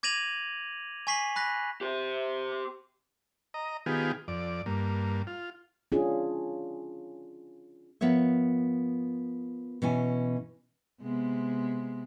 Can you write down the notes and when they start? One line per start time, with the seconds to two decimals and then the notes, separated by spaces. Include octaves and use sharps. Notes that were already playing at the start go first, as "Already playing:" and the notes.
0.03 D6 G#6 A#6 D#7 F7 F#7
1.07 G#5 C#6 B6 C7 F#7
1.36 B5 F#6 A#6 B6
1.81 G4 C5
3.54 D#5 A#5
3.86 D#3 B3 F4 G4 G#4
4.28 F2 D5
4.66 G2 A#3
5.27 F4
5.92 C#4 D4 F4 G#4
8.01 F3 B3 A#4 C#5 E5
9.82 B2 E3 C#4 G#5
11.02 C3 G#3 B3